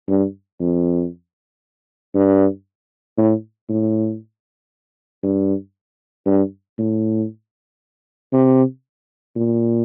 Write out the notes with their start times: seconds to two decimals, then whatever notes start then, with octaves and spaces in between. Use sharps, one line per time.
0.08 G2
0.60 F2
2.15 G2
3.18 A2
3.69 A2
5.23 G2
6.26 G2
6.78 A2
8.32 C3
9.36 A#2